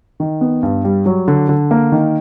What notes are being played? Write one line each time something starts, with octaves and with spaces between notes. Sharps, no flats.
D#3
B3
G2
G3
F#3
D3
D3
A#3
D#3